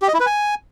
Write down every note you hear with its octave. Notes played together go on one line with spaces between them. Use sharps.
G4
D#5
E4
B4
G#5